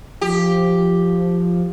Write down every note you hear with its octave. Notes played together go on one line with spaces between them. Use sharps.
F3 G4